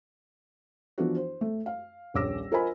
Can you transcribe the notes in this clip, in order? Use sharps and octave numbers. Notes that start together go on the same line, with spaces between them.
E3 F3 B3 D4 E4 F#4
C5
A3
F5
D#1 A#1 C#5 D6 E6 A#6
F4 A#4 C5 D#5 G#5 B5